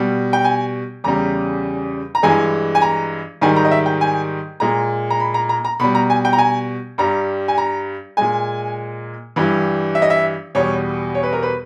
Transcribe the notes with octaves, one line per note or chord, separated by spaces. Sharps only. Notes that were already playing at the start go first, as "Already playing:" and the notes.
Already playing: B2 G3
G5
G#5
E2 C#3 G3 A#5
A#5
G2 E3 G#3 G#5
G#5
A#5
G#2 D#3 G3 G#5
A#5
D#5
E5
G5
G#5
A#2 G#3 A#5
A#5
B5
A#5
A#5
A#5
B2 G3 B5
A#5
G#5
G5
A#5
G#5
G2 G3 A#5
G#5
A#5
A#2 G#3 G#5
G2 E3 G3
E5
D#5
E5
E2 B2 G3 C#5
C#5
B4
A#4
B4